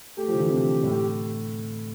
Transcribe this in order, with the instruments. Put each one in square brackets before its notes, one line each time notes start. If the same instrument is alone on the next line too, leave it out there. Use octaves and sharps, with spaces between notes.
[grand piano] A3 [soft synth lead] G4
[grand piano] F3
D3
E3
C3
A2